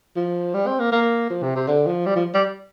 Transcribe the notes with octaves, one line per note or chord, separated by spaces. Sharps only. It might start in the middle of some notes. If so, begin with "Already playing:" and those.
F3
G3
C4
A#3
A#3
F3
C3
C3
D3
F3
G3
F3
G3